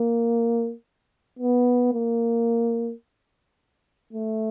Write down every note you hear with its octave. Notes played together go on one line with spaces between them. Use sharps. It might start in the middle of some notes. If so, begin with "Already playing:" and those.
Already playing: A#3
B3
A#3
A3